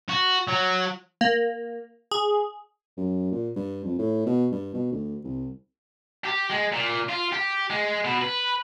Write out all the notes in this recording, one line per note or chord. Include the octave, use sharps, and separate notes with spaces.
F#4
F#3
A#3
G#4
F#2
A#2
G2
F2
A2
B2
G2
B2
D2
C2
G4
G#3
A#2
F4
G4
G#3
B2
B4